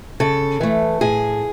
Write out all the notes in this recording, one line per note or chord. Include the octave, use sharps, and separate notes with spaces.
C#3 A4
E3 A3
A2 G#4